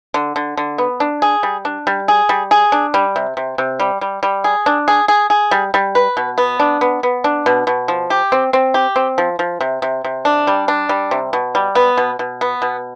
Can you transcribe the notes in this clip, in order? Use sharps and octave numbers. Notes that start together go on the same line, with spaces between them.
D3
D3
D3
B3
D4
G#4
G3
D4
G3
G#4
G3
G#4
D4
G3
C3
C3
C3
G3
G3
G3
G#4
D4
G#4
G#4
G#4
G3
G3
B4
B2
B3
D4
B3
B3
D4
B2
B2
F3
G4
C4
C4
G4
C4
F3
F3
C3
C3
C3
D4
G3
D4
G3
C3
B2
G3
B3
B2
B2
B3
B2